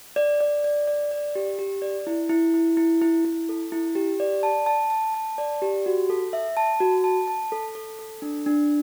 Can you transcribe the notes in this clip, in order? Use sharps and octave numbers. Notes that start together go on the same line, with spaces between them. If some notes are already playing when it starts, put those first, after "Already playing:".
D5
D5
D5
D5
D5
G4
G4
D5
E4
E4
E4
E4
E4
E4
A4
E4
G4
D5
A5
A5
A5
A5
D5
G4
F#4
A4
E5
A5
F#4
A5
A5
A4
A4
A4
D4
D4